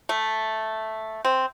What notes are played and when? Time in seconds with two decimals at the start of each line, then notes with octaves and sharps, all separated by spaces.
0.09 A3
1.25 C4